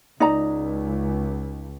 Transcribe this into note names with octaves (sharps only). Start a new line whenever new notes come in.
C#2 D#4 D5 A#5